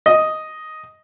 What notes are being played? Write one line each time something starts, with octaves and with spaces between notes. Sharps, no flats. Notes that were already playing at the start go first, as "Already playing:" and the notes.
D#5